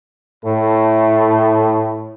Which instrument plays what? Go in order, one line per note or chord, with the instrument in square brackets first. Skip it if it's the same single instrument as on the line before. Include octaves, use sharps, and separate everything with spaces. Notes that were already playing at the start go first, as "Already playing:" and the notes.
[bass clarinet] A2 [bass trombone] A3